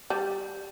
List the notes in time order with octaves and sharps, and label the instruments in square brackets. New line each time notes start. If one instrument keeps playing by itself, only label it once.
[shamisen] G3